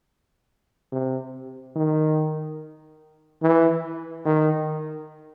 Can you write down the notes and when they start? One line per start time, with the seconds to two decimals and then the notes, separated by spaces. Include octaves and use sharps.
0.92 C3
1.75 D#3
3.42 E3
4.25 D#3